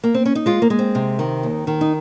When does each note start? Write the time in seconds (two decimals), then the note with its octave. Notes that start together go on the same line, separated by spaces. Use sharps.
0.04 A#3
0.14 C4
0.25 C#4
0.35 D#4
0.46 G#3 F4
0.62 A#3
0.70 G#3
0.79 C4
0.95 C3
1.19 D#3
1.43 D#2
1.67 D#3
1.81 D#4